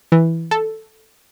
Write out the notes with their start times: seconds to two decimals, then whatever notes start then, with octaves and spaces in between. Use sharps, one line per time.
0.12 E3
0.51 A4